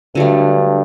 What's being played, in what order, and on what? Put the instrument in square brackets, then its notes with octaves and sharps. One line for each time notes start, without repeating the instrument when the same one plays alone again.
[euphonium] G2 [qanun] D3 F#3 A3